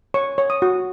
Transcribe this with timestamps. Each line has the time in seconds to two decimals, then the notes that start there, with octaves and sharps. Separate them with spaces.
0.14 C#5 C#6
0.38 C#5
0.50 D#6
0.62 F#4